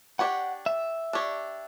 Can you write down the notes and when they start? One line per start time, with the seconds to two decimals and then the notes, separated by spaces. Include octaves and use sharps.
0.19 D4 G4 C#5 F#5
0.66 E5
1.13 D4 G4 C#5